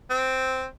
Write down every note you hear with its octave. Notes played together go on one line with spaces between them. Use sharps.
C4